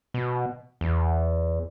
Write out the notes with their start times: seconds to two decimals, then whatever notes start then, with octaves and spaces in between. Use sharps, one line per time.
0.14 B2
0.81 E2